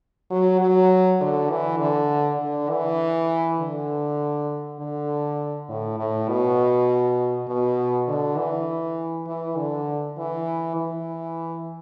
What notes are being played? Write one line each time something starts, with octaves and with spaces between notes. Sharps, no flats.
F#3
F#3
D3
E3
D3
D3
E3
D3
D3
A2
A2
B2
B2
D3
E3
E3
D3
E3
E3